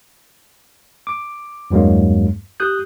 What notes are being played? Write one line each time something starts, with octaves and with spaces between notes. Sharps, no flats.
D6
E2 G2 F#3 G#3 A#3
G4 D#6 F#6 G6